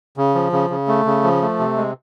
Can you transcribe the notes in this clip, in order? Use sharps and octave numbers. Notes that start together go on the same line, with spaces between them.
C#3
F3
C#3
C#3
A3
C#3
F3
A3
C3
G#3